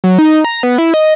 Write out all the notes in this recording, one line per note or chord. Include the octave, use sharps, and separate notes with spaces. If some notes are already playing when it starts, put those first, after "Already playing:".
F#3
D#4
A#5
B3
E4
D#5